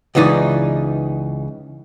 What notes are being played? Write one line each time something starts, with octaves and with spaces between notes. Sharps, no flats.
C#2 C#3 E3 D#4 D5